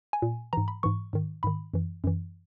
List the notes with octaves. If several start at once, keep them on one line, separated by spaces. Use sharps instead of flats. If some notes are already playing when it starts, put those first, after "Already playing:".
G#5
A#2
G#2 E3 A#5
B5
G#2 E3 C#6
G#2 D#3
G#2 D#3 B5
F#2 E3
F#2 E3